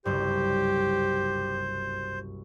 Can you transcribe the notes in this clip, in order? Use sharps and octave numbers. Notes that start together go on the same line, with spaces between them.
F#1 C2 G2 G4 C5